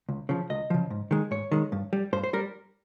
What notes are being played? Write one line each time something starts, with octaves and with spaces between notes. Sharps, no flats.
C#2
C#3 F3
C#2 D#5
C#3 F3
G#2
D#3 G#3
G#2 C#5
D#3 G#3
G2
G3
G2 C5
C5
G3 A#4